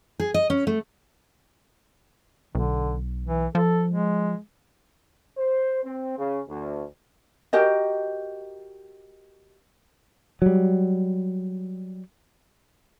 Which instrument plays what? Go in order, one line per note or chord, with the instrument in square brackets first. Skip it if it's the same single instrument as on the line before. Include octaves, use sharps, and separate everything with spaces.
[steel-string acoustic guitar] G#4
D#5
C#4
A3
[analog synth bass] B1 [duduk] D3
[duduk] E3
[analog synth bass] F3 [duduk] A4
[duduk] G#3
[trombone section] C5
C4
C#3
D2
[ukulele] F#4 G4 A#4 D#5
[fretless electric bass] F#3 G3